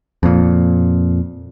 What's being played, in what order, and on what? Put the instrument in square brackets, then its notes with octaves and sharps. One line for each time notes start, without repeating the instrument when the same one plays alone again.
[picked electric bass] F2 A#2